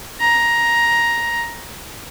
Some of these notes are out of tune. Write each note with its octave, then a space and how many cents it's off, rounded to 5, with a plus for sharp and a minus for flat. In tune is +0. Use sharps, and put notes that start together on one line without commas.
A#5 +10